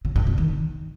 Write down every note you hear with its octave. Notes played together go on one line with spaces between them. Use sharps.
C#3
G2
C3
D#3